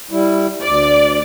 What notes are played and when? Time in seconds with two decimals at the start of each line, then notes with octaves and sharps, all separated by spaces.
0.11 G3 E4
0.61 D2 D5